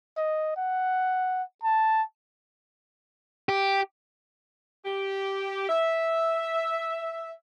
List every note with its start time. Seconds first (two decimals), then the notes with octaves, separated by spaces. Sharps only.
0.17 D#5
0.57 F#5
1.64 A5
3.49 G4
4.85 G4
5.69 E5